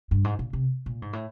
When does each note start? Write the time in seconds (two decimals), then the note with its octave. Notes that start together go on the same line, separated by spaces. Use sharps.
0.11 G2
0.24 G#2
0.39 A#2
0.53 C3
0.86 A#2
1.02 G#2
1.13 A2